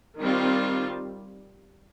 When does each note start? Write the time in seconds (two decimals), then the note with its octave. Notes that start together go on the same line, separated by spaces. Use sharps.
0.18 D#3 G3 C4 F4